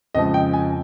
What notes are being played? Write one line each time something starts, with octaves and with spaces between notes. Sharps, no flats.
F2 C#3 F3 G#3 D#5
G5
G#5